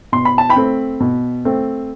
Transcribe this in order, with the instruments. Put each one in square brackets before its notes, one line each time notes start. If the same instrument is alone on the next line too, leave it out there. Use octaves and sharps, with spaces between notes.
[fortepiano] B2 C6
B5
A5
G5 B5
A3 C4
B2
A3 C4